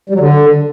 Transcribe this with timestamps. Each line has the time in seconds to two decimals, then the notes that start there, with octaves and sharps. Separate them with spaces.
0.10 G3
0.15 F#3
0.20 D3